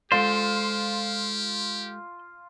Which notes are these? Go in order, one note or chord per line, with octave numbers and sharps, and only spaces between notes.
G#3 F4 G4 A4 C5 D5